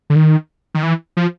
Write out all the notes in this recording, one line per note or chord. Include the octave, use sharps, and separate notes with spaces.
D3
D#3
D#3
E3
F3